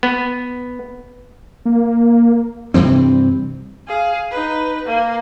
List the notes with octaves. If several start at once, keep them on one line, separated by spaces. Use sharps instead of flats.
B3
A#3
G2 C3 E3 C4
G#4 F5
D#4 B4
A#3